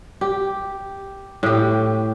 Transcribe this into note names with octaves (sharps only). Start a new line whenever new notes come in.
G4
A2 G4